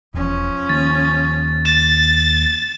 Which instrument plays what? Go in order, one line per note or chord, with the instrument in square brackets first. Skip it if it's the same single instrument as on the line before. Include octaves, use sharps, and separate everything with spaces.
[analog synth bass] E1 [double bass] F3 C#4
[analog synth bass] D#2 [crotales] A6
[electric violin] A6 [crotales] E7